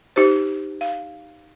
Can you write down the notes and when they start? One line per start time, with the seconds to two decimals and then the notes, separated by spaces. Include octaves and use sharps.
0.16 D#4 G4 C5
0.81 F5